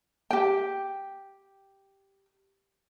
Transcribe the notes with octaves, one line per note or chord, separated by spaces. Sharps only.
G4 G5